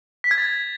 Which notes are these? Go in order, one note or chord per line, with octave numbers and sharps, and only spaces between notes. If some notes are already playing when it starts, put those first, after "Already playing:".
B6
G#6
A6